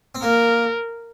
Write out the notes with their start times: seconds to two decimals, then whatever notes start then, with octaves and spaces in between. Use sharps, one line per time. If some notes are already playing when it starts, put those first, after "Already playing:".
0.15 C4
0.22 A#3 A#4